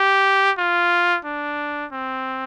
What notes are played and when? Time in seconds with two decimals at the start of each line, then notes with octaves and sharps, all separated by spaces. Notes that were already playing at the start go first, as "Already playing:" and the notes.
Already playing: G4
0.58 F4
1.25 D4
1.92 C4